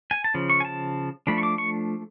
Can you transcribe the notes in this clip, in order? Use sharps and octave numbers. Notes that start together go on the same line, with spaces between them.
G#5
A5
C#3 F3
C#6
G#5
A5
F3 A3 D4 B5
C#6
D6
C#6